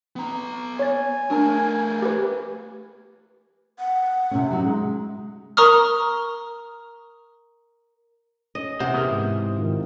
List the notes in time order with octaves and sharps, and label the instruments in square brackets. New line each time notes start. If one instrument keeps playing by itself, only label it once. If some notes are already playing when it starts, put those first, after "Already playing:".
[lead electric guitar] B3 A#5
[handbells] C#5 A6 [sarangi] G#5
[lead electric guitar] A3 A#4 [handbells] D4 A5
[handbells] G4 B4
[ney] F#5
[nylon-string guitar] C3 C#4
F#3 D#4
G#3
[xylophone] A#4 A#5 C#6 D#6 F6
[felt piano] C#4 [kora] D#5
[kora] C3 E3 [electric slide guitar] C5 [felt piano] F#5
[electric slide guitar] B3 G#4 A#4 [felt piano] D#6
[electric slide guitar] G#2
[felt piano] D#3 F4